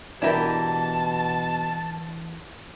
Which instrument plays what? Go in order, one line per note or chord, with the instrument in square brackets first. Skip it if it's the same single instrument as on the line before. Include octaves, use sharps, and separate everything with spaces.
[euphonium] B2 [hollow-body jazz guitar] E3 D4 [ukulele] E4 G4 A#4 [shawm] A5